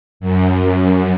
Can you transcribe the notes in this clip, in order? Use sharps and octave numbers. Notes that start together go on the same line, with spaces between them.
F#2